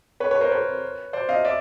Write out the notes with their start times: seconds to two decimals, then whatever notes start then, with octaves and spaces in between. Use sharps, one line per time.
0.20 B4 C#5
0.31 B4 C#5
0.41 A#4 C5
0.52 B4 C#5
1.13 C5 D5
1.29 D#5 F5
1.45 D5 E5